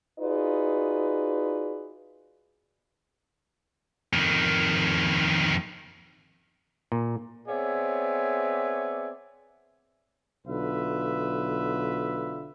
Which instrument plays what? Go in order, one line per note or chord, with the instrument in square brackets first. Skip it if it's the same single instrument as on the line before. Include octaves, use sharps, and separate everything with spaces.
[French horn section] D#4 F4 F#4 G#4 B4 D5
[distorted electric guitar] F2 D#3
[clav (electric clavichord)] A#2
[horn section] B3 C4 G#4 C#5 D5 E5
[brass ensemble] B1 D3 F4 B4 E5